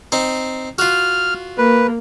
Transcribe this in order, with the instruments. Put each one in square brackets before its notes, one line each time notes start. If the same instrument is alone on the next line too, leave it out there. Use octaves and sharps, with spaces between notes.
[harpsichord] C4 D#4
[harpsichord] F4 F#4 [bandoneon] F6
[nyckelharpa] A#3 [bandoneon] B4